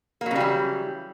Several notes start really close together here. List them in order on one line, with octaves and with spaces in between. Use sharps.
A#3 F#3 C#3 G3 E3